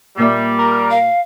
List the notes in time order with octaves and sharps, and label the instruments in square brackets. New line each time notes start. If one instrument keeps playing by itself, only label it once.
[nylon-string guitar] A#2 A#3 E5 [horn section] G3
[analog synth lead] A#4
[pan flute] F5